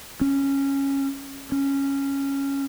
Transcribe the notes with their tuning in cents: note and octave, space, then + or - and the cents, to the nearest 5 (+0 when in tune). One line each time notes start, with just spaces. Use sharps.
C#4 -10
C#4 -5